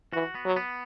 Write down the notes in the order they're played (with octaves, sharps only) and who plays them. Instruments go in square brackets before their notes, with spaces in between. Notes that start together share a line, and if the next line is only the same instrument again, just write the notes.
[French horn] E3 [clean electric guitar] F#4
[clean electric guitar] B3
[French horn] F#3
[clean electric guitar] B3